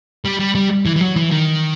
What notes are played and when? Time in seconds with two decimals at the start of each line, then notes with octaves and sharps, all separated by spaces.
0.25 G3
0.40 G3
0.55 G3
0.86 E3
0.96 E3
1.01 F#3
1.16 E3
1.31 D#3